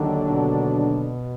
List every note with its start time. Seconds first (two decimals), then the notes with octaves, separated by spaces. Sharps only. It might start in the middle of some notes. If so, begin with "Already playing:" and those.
Already playing: D#2 D3 D#3 F#3 D4
0.28 B2